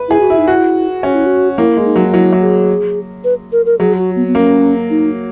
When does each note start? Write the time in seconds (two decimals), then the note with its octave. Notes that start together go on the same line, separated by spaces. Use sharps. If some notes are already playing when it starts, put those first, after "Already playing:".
Already playing: B4
0.08 E4 G#4
0.20 F#4
0.30 E4
0.38 D#4
0.47 E4 F#4
1.03 C#4 F#4
1.15 E4
1.26 F#4
1.58 A#3 E4
1.77 G#3
1.86 D#4
1.96 F#3
2.05 F#4
2.13 F#3 E4
2.32 F#3
2.41 G#4
3.24 B4
3.52 A#4
3.66 A#4
3.80 F#3 G#4
3.98 F#4
4.16 B3
4.27 B3
4.35 A#3 C#4
4.90 D#4